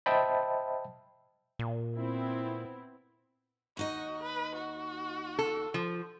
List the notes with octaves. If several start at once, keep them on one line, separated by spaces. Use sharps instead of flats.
C5 D#5 E5 G5 A5 B5
A#2
B3 C4 E4
D#2 D#4 F#4 D#5
B4
F#4
A4
F3